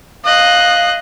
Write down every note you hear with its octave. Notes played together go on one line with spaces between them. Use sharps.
D#5 F5 F#6